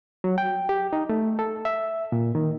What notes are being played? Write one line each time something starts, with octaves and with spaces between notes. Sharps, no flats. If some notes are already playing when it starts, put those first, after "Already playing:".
F#3
G5
G4
D#4
A3
A4
E5
A#2
D#3